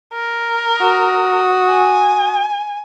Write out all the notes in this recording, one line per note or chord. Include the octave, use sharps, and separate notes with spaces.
A#4
F#4 D#6
G#5